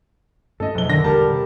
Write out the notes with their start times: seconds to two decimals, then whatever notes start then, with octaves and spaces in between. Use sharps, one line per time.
0.60 G2 A3 C#4 A4 D#5
0.75 F#1 F2 B2 F3 G7
0.90 D3 D#3 A#6
1.04 E1 A1 G3 A#4 A5
1.32 C3